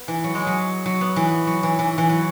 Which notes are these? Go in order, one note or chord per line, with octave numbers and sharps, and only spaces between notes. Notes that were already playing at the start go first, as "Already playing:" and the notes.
Already playing: B3
E3
F#3
G#3
F#3
F#3
B3
E3
F#3
E3
E3
E3
F#3